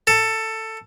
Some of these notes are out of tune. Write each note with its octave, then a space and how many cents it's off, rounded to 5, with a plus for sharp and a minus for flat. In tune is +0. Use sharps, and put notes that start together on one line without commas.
A4 +15